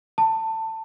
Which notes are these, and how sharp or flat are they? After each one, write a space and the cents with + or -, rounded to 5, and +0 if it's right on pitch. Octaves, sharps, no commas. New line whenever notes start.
A5 +20